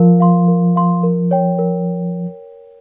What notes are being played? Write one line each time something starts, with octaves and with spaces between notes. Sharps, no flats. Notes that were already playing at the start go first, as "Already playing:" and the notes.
Already playing: F3 A#4 F5
F5 C6
A#4
F5 C6
A#4
C#5 G5
A#4